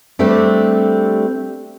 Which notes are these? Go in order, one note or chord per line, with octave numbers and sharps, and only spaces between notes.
G3 A3 C4 D4 G4